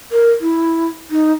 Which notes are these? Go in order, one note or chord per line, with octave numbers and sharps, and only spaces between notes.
A#4
E4
D#4